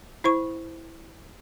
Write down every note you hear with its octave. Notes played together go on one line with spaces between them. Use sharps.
E4 C5 C#6